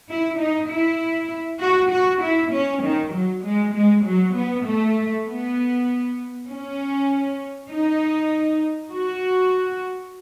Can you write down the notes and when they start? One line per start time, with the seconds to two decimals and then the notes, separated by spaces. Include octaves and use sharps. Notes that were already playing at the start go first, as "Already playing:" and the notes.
0.09 E4
0.39 D#4
0.70 E4
1.61 F#4
1.91 F#4
2.22 E4
2.52 C#4
2.83 D#3
3.13 F#3
3.44 G#3
3.74 G#3
4.05 F#3
4.35 B3
4.66 A3
5.26 B3
6.48 C#4
7.70 D#4
8.92 F#4